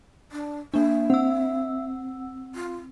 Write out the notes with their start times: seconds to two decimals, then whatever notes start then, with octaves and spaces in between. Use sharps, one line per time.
0.32 D4
0.74 A#3 D4 E5
1.10 C4 F#5 E6
2.55 F4